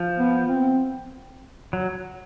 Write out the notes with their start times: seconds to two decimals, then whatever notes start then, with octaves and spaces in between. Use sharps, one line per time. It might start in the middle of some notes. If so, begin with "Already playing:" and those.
Already playing: F3
0.19 B3
0.49 C4
1.73 F#3